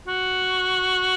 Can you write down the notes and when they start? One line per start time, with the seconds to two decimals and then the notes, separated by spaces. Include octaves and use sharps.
0.08 F#4